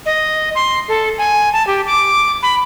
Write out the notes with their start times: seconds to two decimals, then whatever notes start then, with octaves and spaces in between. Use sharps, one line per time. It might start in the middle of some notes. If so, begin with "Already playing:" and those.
0.06 D#5
0.55 C6
0.88 A4
1.18 G#5
1.53 A5
1.67 G4
1.87 D6
2.43 B5